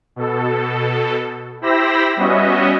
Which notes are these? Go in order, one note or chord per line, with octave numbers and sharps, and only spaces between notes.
B2 A4
E4 G4 C5 B5 E6 A#6
G3 B3 C#4 F#4 D#5 E5